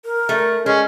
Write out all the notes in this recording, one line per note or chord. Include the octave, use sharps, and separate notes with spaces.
A#4
A3
G#3 C#4